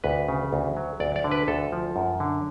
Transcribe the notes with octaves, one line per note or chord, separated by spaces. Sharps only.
D2 B4
C#3
D2
F#3
D2 D5
D5
D3
B4
D2 A4
F3
F#2
D3